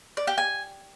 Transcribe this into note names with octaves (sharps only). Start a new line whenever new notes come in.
D5
G4
G#5